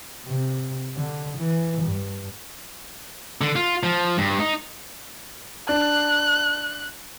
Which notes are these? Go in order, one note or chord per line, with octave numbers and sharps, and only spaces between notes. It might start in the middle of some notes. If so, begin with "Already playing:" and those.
C3
D3
E3
G2
D3
F4
F3
G2
D#4
D4 F#6